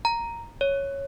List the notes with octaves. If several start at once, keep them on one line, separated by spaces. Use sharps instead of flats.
A#5
C#5